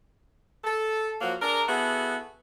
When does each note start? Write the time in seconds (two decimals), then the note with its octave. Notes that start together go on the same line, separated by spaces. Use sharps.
0.64 A4
1.21 F3 F#3 A#3 F#4
1.42 D4 G#4 A#4
1.69 B3 E4 F#4 G#4 A4